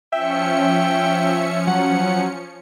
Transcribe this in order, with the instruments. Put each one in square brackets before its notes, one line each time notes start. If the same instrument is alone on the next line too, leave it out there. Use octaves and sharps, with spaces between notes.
[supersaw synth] F3 C#4 C#7 [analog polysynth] E5 [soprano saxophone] G5
[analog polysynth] F#3 [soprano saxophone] F#5